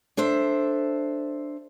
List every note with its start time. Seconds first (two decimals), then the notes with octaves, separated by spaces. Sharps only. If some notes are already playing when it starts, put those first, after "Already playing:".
0.17 D4 A4 C5 E5